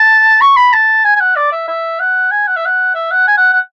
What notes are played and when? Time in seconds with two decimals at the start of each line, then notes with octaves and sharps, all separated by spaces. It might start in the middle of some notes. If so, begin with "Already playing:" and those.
Already playing: A5
0.41 C#6
0.57 B5
0.73 A5
1.04 G#5
1.16 G#5
1.20 F#5
1.36 D5
1.52 E5
1.68 E5
2.00 F#5
2.31 G#5
2.48 F#5
2.57 E5
2.66 F#5
2.95 E5
3.11 F#5
3.28 G#5
3.38 F#5
3.53 F#5